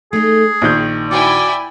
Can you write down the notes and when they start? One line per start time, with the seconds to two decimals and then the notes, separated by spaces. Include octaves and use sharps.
0.13 A3 D#4 G#4
0.62 A#1 D#3 G5 G6
1.11 E4 F#4 D5 G5 G#5